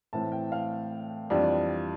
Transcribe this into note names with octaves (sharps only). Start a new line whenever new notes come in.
A2 E3 A3 C4 A5
G5
F5
F2 E3 G3 D4 F4 D5